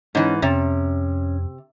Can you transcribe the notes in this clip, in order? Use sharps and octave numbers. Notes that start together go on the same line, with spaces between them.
G#2 E3 C#4
F2 C3 C#4